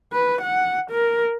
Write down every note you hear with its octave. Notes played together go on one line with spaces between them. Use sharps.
B4
F#5
A#4